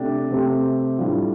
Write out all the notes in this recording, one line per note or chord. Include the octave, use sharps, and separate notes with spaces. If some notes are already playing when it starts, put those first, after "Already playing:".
Already playing: C3 A3 D4 G4
C3 A3 C4 G4
A2 G3 D4 F4